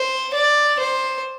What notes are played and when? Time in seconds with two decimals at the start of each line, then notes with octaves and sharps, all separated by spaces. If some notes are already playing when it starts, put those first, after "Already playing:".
Already playing: C5
0.34 D5
0.79 C5